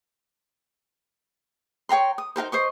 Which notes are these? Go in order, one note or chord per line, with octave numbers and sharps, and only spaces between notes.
C#5 G5 A#5 C6
D#6
D#4 G4 A#4 C5
C5 D#5 C#6